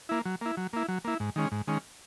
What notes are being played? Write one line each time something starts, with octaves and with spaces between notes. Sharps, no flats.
A#3 E4
F#3
A#3 E4
F#3
A#3 E4
F#3
A#3 E4
G#2
D#3 G#3 C#4
G#2
D#3 G#3 C#4